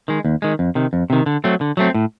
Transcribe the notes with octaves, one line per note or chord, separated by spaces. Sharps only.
D#3 G#3
D#2
D#3 G#3
F2
C3 D#3
F2
C3 D#3
D3
F#3 A3 C4
D3
F#3 A3 C4
A2